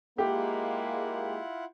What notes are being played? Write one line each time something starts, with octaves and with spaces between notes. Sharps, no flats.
G#3 A#3 E4 F4 G4 F#5